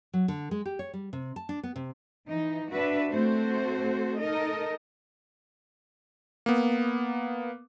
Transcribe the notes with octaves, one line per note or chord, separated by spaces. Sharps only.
F#3
D3
G#3
G4
C#5
G3
C3
A5
D4
B3
C3
E3 D#4
D4 F#4 B4 E5
A3 C4 F#4 A4 C5
D#4 A4 A#4 D#5
A#3 B3